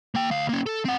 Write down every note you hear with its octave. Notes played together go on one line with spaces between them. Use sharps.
A#3 G5
D2 F5
A#3 C#4
A4
C4 F#5